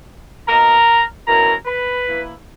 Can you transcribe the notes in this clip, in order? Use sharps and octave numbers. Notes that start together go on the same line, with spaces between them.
B2 A#3 D#4 A#4 A#5
B2 F#3 C#4 E4 A#4 A#5
B4 B5
E3 A#3 E4